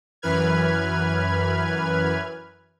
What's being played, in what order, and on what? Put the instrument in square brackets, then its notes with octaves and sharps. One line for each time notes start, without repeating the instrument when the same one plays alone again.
[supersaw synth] F#2 E3 B4 F6 G#6